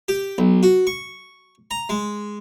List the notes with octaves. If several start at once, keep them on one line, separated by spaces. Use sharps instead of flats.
G4
B1
F#4
C#6
A#5
G#3